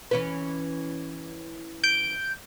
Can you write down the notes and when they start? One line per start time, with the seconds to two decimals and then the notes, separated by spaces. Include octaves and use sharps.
0.11 E3 C#4 B4
1.84 G6 D7